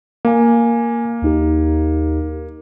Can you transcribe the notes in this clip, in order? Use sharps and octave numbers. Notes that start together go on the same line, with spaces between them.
A#3 F5 G#5
D#2 D#4 G4